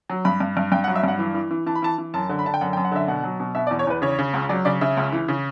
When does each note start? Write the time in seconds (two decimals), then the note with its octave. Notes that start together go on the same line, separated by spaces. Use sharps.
0.10 F#3
0.25 G2 B5
0.40 G2
0.57 G2
0.72 G2 G5
0.84 F#5
0.88 F#3
0.96 E5
1.04 G2 F#5
1.19 E3
1.34 E3
1.51 E3
1.66 E3 A5
1.75 B5
1.82 E3 A5
1.98 E3
2.14 F#2 A5
2.29 D3
2.39 B5
2.45 D3 A5
2.54 G5
2.61 F#2 F#5
2.73 G5
2.77 F#2
2.85 F#5
2.92 D3 E5
3.08 B2 F#5
3.23 F#3
3.40 B2
3.55 B2 E5
3.67 D5
3.71 E2
3.79 C#5
3.87 E2 B4
4.02 C#3 C#5
4.19 C#3
4.34 C#2
4.49 F#3 D5
4.65 C#3 D5
4.81 C#3 E5
4.97 C#2
5.13 E3
5.28 C#3